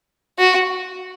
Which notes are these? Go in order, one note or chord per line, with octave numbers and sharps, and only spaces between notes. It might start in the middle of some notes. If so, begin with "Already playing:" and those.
F#4